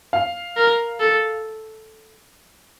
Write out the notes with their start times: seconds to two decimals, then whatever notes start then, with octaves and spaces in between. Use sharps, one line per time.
0.13 F5
0.56 A#4
1.00 A4